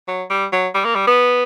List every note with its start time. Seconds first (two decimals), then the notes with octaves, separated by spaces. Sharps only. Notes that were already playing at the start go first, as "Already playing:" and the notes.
0.08 F#3
0.30 G3
0.53 F#3
0.75 G3
0.85 A#3
0.95 G3
1.07 B3